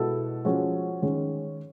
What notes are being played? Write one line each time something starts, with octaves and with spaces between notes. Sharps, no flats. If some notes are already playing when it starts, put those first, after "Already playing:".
Already playing: B2 G#3 B3 E4 A4
F3 G#3 C#4 F#4
D#3 G#3 C#4